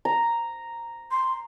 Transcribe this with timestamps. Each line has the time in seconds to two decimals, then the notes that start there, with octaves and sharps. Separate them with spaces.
0.05 A#5
1.11 C6